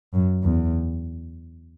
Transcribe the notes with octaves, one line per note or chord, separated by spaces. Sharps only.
F#2
E2